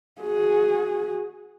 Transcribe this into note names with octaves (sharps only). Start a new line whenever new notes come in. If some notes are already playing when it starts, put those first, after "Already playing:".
F#4 G#4